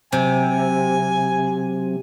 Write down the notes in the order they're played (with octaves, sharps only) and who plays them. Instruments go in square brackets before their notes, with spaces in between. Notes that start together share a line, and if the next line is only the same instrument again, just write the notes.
[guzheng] C3 [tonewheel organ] F#3 C4 [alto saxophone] G#5